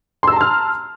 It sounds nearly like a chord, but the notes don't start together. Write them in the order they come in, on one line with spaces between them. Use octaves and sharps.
C6 E6 A#5 A5 F6